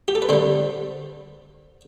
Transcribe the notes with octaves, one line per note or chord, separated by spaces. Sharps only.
G4
A4
B4
D3 G3 C4 C5